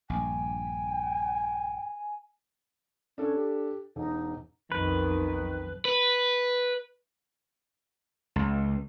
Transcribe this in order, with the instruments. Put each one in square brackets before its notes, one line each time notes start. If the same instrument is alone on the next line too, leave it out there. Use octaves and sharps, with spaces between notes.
[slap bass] A#1 G2 [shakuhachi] G5 [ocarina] G#5
[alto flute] C#4 [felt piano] D4 A4
[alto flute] G4
[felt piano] E1 [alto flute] D#4
[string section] B1 [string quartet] F2 [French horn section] D#3 [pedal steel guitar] B4
[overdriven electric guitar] B4
[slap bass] C#2